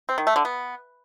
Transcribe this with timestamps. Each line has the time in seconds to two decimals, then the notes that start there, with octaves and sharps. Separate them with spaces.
0.09 C4
0.18 D#3
0.27 A3
0.36 D3
0.45 B3